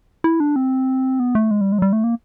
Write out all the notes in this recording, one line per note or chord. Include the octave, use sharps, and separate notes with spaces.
E4
D4
C4
B3
A3
G#3
G3
G#3
F#3
G3
A3
A#3